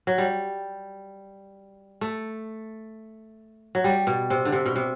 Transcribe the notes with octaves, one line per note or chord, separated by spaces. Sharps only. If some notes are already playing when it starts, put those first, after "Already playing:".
F#3
G3
A3
F#3
G3
B2
C3
D3
C3
B2
C3